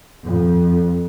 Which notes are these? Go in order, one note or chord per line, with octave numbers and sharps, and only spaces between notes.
F2